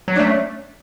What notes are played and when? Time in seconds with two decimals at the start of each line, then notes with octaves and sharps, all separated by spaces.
0.08 F#3
0.16 D4
0.19 A3 C#4